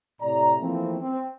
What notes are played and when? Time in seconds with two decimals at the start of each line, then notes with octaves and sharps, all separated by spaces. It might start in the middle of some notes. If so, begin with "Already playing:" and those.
0.21 A2 C3 D5 A#5
0.60 E3 F3 A3 A#3 C4
1.00 C4